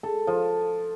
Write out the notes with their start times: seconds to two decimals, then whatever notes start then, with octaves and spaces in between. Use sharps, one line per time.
0.03 A4
0.27 F3